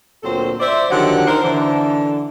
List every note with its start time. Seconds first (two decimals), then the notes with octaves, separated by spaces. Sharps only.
0.23 D2 A#2 F#3 C4 A4 C5
0.60 C5 D5 E5
0.91 D3 D#3 F3 F#3 G4 F#5
1.27 D#4 A#4 C5
1.44 D3 E3